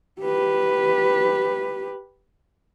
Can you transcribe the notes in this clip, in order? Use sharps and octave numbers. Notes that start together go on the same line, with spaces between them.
G4 B4